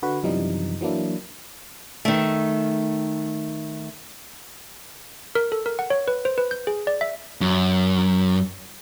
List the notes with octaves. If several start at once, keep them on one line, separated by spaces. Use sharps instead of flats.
D3 F#4 B4
F#2 C3 E3 F3 G3 D#4
E3 F#3 A#3 D4 E4
D#3 A3
A#4
A4
A#4
F#5
C#5
B4
C5
B4
G6
G#4
D5
E5
F#2